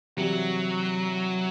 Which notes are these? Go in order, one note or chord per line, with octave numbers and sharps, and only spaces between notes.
C3 E3 F#3 G3